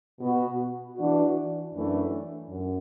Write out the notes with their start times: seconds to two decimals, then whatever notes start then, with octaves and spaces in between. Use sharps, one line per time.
0.20 B2 B3 F#4
0.96 E3 D4 F#4
1.74 F#2 E3 A3 D4
2.50 F#2